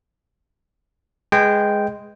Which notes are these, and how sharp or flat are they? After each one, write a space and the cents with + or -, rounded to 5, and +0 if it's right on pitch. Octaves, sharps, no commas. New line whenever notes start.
G#3 +0 B4 +0 G5 -5